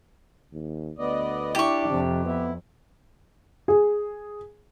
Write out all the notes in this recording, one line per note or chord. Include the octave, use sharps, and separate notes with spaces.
D#2
D2 B3 D5 D#5
D4 E4 G4 A5 C#6
F2 C3
B3 E4
G#4